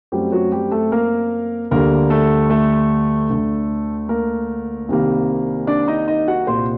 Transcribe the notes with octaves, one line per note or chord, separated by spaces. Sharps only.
F#2 F#3 G3 A3 C4 G4
F#3 F#4
G3 G4
A3 A4
A#3 A#4
D2 D3 G3 A#3 A#4
A3 A4
A3 A4
D2 D3 A3
A#3 A#4
C2 C3 D#3 G3 A#3
D4 D5
D#4 D#5
D#4 D#5
F#4 F#5
C2 A#2 G3 A#3 C5 C6